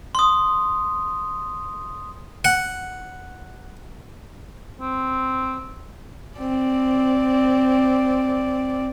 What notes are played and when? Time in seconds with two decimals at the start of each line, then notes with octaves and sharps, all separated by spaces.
0.15 C6 D#6
2.45 F#5
4.81 C4
6.38 C4 D5